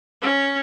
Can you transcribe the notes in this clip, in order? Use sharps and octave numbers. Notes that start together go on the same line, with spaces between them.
C#4